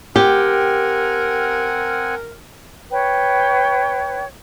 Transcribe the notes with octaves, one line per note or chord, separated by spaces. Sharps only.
C4 G4 A#4 F#5 G#5
B4 C#5 G5